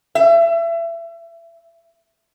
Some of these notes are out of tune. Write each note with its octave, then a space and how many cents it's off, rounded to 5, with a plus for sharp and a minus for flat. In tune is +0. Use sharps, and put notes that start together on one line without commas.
E5 +30